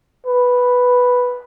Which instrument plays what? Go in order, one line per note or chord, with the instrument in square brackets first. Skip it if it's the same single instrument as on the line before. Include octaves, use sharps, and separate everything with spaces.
[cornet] B4